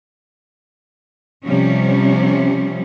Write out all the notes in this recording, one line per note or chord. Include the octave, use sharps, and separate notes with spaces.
C3 F3 G3 C#4